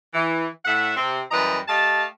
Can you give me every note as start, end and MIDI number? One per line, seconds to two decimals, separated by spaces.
0.14 0.47 52
0.65 0.91 45
0.65 0.91 76
0.65 0.91 78
0.97 1.19 48
0.97 1.19 60
1.31 1.58 42
1.31 1.58 52
1.31 1.58 55
1.31 1.58 71
1.31 1.58 75
1.31 1.58 82
1.68 2.04 57
1.68 2.04 67
1.68 2.04 75
1.68 2.04 77
1.68 2.04 81